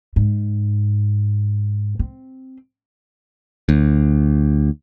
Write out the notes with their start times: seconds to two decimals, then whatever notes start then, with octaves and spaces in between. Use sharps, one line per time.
0.16 G#2
1.99 C4
3.69 D2